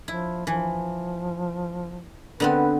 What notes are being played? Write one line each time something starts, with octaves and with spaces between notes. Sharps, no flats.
F3 E4
E3 F3
D3 B3 C4 B4